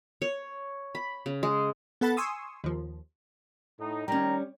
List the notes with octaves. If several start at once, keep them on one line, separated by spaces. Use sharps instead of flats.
C#5
B5
C#3
G#3
B3 A4 F#5 B5 A6
G#5 C6 C#6 D#6 E6
D#2 F3
A2 D#4
D#3 G3 C#4 G5 A#5